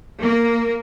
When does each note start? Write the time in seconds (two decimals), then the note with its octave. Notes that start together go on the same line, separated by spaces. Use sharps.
0.22 A#3